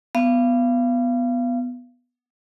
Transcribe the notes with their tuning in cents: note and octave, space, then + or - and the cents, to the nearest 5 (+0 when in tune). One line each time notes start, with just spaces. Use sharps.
B3 +0 F5 -30